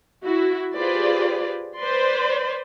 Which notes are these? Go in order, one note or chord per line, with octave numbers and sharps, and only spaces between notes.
E4 F#4
F4 G4 G#4 B4 C5 D5
B4 C5 D5 C6